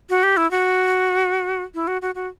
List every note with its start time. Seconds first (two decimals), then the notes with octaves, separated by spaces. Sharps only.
0.10 F#4
0.23 G4
0.37 E4
0.51 F#4
1.74 E4
1.87 F#4
2.02 F#4
2.15 F#4